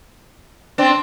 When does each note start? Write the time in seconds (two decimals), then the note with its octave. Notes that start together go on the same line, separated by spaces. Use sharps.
0.78 C4 D4